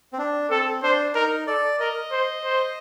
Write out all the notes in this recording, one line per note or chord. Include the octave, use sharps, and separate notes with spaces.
C4
D4
C4 A4
D4 C5
D#4 A#4
A4 D5
A#4 D#5
C5
C5